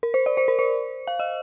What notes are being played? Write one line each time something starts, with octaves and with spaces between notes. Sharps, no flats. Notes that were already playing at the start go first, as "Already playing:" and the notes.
A#4
C5
D5
C5
A#4
C5
F5
D#5